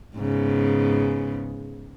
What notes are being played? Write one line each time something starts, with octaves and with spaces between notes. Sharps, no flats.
G#2 C#3 B3